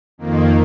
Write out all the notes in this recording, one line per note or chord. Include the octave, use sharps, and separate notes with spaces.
F2 D#3 A#3